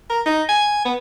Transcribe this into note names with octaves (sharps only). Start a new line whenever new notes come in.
A#4
D#4
G#5
B3